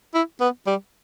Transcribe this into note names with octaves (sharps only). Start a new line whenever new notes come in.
E4
B3
G3